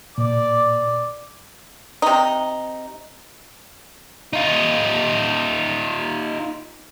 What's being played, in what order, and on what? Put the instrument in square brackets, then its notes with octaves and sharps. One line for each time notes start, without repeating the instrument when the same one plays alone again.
[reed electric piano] A#2 [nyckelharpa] D5
[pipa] C3 D#4
[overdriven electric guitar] D#4 F4